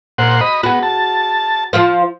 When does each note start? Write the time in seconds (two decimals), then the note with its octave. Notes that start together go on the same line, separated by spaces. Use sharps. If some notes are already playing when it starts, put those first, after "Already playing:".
0.18 A#2 C5 F#5
0.41 D#5 B5
0.63 B3 F#4 G#4
0.83 A5
1.73 F3 F4 C5